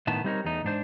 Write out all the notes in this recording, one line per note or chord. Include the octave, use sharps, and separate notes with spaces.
A2 D#3 B3 A5
G3 C4 D#4 G4 A#4 C#5
E2 A3 D#4
G#2 D4 C5